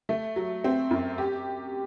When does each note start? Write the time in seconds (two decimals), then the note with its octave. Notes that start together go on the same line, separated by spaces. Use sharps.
0.09 A3
0.36 F#3
0.64 C4
0.91 F#2
1.18 G4